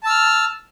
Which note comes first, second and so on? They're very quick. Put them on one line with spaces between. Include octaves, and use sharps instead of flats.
A5 E6 F6